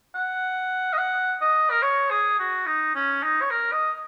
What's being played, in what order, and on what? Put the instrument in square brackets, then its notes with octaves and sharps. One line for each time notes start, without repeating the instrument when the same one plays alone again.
[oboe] F#5
D#5
F#5
D#5
A#4
C#5
G#4
F#4
D#4
C#4
D#4
C#5
A#4
D#5